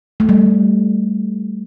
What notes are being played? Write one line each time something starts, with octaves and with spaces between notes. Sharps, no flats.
A3
G3